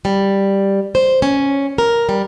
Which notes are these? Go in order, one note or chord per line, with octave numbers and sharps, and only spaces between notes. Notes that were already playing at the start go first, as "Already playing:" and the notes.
G3
C5
C#4
A#4
G3